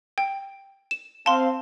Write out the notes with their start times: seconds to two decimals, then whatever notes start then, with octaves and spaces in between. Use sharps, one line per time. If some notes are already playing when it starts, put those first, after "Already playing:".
0.18 G5
0.91 E7
1.26 C4 F5 A5 C6